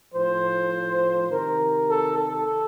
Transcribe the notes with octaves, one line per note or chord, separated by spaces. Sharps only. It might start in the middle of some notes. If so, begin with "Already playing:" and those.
A2 F3 C5
C3 D#3 A#4
A4
A4